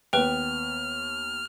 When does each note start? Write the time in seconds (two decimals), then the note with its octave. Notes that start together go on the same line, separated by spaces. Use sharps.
0.13 D#2 B3 B4 G5 F6